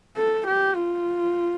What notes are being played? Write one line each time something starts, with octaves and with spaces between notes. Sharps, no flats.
A4
G4
F4